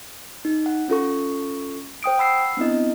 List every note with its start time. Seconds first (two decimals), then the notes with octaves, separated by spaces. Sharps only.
0.45 D#4
0.66 F#5
0.88 C#4 F4 A4 C#6
2.03 C5 G5 D#6 D7
2.18 F#5 B5 E6 C7
2.57 B3 C4 D4 E4 D#5